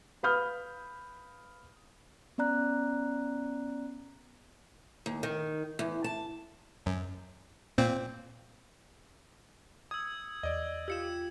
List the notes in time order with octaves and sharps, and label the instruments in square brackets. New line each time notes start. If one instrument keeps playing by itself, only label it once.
[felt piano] B4 F5 B5 D#6 F6 G6
[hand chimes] B3 C#4 D5 A#5 F#6
[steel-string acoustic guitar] D#2
D#3
E2
A5
[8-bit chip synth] F#2
A#2 C4
[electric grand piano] D#6 [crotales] E6 G#6
[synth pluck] E2 [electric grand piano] D5 D#5
[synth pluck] F4 G4 [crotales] E6 C#7 E7